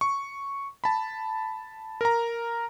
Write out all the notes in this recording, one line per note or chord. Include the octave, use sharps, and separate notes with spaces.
C#6
A5 B5
A#4 A#5